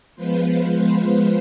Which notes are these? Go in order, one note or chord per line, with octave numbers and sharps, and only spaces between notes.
F3 G#3 B3 F4 B4 C5